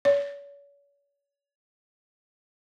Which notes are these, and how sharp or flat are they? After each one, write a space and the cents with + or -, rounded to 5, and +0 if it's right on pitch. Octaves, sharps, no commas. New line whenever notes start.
C#5 +40